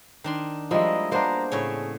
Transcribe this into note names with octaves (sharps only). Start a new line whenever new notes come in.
D#3 D4 C6
F3 G3 G#3 A#3 E4 D#5
G#3 A#3 B3 D4 C5 D5 A#5
A2 C#3 G#4 C#5